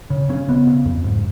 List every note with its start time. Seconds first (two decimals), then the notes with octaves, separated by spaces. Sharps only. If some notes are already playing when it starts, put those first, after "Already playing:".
0.10 C#3
0.29 C#3 C#4
0.48 C#3 B3
0.67 C#3
0.85 F2
1.04 G#2